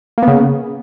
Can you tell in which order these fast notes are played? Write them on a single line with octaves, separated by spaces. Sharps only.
A#3 B3 C#3